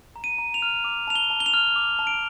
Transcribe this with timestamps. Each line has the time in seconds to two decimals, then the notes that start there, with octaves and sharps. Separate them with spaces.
0.16 A#5
0.24 D#7
0.38 A#5
0.54 F7
0.62 F6
0.84 D6
1.08 A5 F7
1.15 G7
1.30 A5
1.40 G7
1.46 F7
1.54 F6
1.76 D6
1.99 A5
2.07 D7